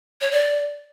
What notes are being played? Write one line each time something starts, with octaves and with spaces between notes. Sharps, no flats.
C#5
D5